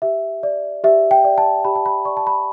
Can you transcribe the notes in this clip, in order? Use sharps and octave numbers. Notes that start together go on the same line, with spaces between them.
G4 E5
D5
G4 E5
G5
D5
A5
G4 B5
A5
B5
D5 C#6
A5
B5